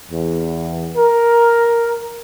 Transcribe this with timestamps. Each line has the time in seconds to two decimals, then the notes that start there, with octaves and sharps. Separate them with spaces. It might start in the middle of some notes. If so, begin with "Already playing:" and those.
0.11 E2
0.96 A#4